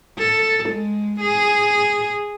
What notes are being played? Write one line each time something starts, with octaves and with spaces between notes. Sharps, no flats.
A4
G#3
G#4